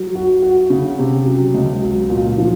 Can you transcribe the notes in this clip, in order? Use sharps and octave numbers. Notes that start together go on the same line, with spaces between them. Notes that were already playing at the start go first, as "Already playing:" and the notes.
Already playing: F#3
F#4
F#4
C#3
C3
F#3
C#2
F#3
A#2
F3